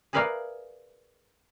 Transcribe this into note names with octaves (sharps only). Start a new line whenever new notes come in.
G#4 A#4 B4 D5 E5 F5